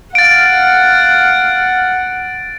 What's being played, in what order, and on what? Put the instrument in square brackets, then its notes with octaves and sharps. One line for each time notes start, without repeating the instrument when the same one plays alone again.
[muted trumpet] F5 [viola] F#5 [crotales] A6 D7